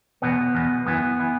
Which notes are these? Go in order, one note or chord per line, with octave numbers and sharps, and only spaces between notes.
E2 B2 B3
E2 B2
F#2 E3 B3
E3